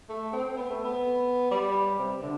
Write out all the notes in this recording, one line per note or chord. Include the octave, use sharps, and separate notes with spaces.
A3
C4
B3
A3
B3
G3
C3
D3